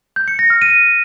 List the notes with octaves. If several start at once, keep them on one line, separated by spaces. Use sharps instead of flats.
G6
C#7
A#6
F6
D#7